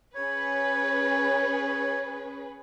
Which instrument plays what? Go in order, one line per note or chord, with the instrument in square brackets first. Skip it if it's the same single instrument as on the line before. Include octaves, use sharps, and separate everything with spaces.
[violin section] C#4 G#4 B4 [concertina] C#5